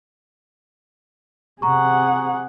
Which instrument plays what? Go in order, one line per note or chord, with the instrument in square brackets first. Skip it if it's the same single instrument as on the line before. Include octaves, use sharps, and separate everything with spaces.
[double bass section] C3 [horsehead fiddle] G#4 F#5 [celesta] A#5 C#6